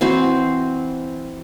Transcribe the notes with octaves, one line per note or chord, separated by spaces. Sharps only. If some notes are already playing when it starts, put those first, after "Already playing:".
E3 C4 F#4 C5